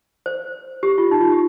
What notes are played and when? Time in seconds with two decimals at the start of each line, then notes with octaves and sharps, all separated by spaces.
0.26 C5
0.83 G4
0.98 F4
1.11 D#4
1.21 F4
1.32 G4